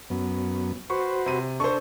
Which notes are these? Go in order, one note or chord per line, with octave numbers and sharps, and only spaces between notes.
F#2 B3
F#4 B4 C5 C#6
C3 D#7
D4 A4 C5 C#6